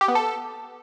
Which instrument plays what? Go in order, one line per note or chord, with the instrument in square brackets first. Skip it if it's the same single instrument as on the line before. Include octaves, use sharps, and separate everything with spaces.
[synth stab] G4
B3
A4